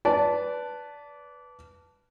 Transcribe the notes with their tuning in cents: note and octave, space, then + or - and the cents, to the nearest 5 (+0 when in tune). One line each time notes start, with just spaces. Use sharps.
B4 +0 D5 -25 A5 +0